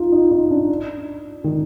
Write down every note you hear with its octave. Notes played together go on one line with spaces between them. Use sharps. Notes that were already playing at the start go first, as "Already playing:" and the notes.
Already playing: D#4 F4
D#4
D#4
D4
D#3